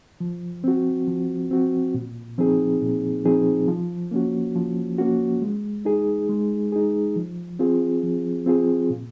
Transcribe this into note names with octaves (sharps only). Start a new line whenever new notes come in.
F3
C4 F#4
F3
C4 F#4
A#2
F3 C4 D#4 G#4
A#2
F3 C4 D#4 G#4
F3
A#3 C#4 F#4
F3
A#3 C#4 F#4
G#3
D#4 G#4
G#3
D#4 G#4
F3
C4 F4 G#4
F3
C4 F4 G#4
A#2